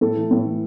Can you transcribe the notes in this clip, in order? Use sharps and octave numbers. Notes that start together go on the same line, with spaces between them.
A2 A4
E3
A2
E3